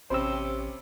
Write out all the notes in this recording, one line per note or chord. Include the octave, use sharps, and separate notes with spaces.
A1 C3 C#4 G4 C5 B5 E6